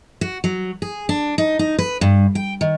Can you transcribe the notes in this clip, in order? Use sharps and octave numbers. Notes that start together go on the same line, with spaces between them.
F#4
F#3
G#4
D4
D#4
D#4
B4
G2
G5
D#3